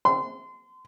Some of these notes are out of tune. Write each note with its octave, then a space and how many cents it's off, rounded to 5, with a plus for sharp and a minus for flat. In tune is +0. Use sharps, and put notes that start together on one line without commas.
C6 -30